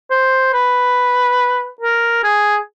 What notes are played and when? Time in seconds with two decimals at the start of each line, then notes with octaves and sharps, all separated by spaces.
0.11 C5
0.53 B4
1.81 A#4
2.24 G#4